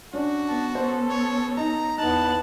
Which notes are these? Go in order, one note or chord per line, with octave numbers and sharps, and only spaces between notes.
C#4 D4 F#4
B3 A5
B3 C#4 A4 C5
C#5
D#4 A#5
E2 B3 D#4 A5 F#6